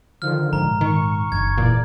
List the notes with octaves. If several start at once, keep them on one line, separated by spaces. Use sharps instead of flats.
D3 D#3 F3 F6
A#1 G#2 A#5
D#3 C#6
F#1 D#4 G#6
E2 A#2 D5